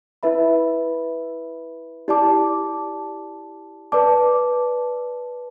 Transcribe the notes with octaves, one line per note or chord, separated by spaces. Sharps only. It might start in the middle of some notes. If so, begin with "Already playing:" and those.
E4 B4 E5 B5
E4 G4 D5 A5 D6
B4 D5 A5 D6